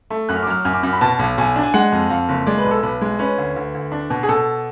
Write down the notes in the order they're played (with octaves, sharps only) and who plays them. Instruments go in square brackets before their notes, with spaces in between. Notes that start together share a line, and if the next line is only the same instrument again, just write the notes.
[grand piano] A3
F#2 F#6
F6
D6
F#3 F6
F#2 F6
D6
F#2
B5
B2 A5
B1
B1 G#5
D4
G#5
G#3 F#5
F2
F2 F5
F#1
G#3 D5
B4
B1
A4
B1 B4
G#3
C#4 B4
D2
D2
D2
D4
B2
G#4
B2 A4